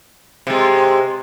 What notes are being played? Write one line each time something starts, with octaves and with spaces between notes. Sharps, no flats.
C3 G#3